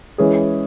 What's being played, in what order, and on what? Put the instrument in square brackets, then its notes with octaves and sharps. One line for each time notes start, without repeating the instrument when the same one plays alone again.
[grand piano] E3 G#3 C#4 G#4